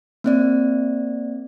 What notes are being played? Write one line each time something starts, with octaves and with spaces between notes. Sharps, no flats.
A#3 C4 D5